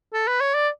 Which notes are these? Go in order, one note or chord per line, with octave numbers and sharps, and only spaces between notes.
A4
B4
C#5
D5